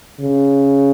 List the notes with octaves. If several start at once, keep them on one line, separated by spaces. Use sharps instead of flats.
C#3